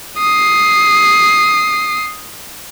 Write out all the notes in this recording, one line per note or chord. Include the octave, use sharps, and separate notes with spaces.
D#6 C7